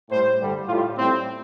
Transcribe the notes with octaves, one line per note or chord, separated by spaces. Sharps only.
A2 G3 C5
G2 D3 G3
A2 G3 F4
A2 G3 C4